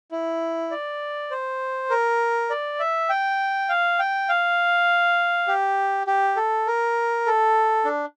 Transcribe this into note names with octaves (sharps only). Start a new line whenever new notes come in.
E4
D5
C5
A#4
D5
E5
G5
F5
G5
F5
G4
G4
A4
A#4
A4
D4